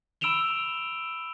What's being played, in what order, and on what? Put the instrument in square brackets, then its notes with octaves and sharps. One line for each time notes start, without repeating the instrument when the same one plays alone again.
[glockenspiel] B5 E6 D7 E7 F7 G7